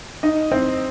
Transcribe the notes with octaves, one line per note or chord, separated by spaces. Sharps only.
D#4 D#5
C4 C5